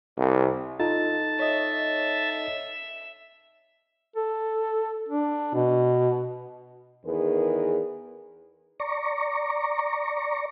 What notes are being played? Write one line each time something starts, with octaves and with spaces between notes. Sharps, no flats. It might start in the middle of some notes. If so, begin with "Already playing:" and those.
C2
D#4 F4 A4 A5
C#5 D#5 E5
A4
D4
B2
E2 D#3 G#4 A#4 B4
D5 A#5 C#6